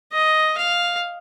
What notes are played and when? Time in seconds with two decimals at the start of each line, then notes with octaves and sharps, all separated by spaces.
0.12 D#5
0.57 F5